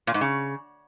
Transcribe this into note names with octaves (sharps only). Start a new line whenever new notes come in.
A#2
G#2
C#3